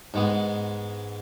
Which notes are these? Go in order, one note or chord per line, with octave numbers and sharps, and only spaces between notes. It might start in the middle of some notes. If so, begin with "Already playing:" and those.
G#2 G#3 B3